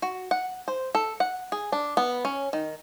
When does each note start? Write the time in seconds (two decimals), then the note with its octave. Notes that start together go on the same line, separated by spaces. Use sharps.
0.02 F#4
0.31 F#5
0.68 C5
0.95 A4
1.20 F#5
1.52 G#4
1.72 D4
1.97 B3
2.25 C#4
2.53 D#3